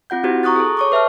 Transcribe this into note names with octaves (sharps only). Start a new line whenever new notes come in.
C4 F4 F#5 G6
C4 E4 F#4 G4 C5
A#5 C#6 D#6 F#6 A6
G#4 A4
C#5 C#6 D6
B4 E5 A5 F6